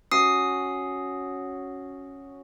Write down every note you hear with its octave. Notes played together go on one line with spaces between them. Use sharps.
C#4 F#4 D#6 C7